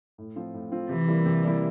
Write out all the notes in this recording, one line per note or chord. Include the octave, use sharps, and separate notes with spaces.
A2
F3 C4 F4
A2
F3 C4 F4
C3 E3
G3 A#3 E4
C3
G3 A#3 E4